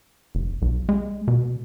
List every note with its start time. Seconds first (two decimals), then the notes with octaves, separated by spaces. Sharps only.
0.35 F1
0.62 B1
0.89 G#3
1.28 B2